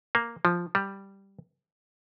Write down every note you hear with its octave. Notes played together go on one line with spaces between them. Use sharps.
A#3
F3
G3